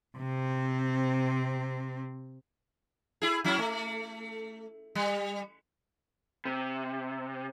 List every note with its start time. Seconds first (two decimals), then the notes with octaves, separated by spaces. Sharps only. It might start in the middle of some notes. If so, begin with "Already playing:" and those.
0.18 C3 C4
3.22 E4 G#4
3.44 F#3 C#4 E4
3.59 A3
4.95 G3
6.45 C3